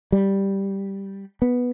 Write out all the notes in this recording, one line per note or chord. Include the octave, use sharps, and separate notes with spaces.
G3
B3